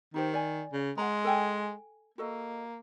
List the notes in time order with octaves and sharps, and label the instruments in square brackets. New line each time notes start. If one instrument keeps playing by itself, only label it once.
[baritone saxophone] D#3 [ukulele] D#4 G4 C5
[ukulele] D5 G#5
[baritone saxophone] C#3
[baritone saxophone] G#3 [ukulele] F#5 A#5
[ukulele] A4 G5 G#5
[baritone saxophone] A#3 [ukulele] F#4 A4 D#5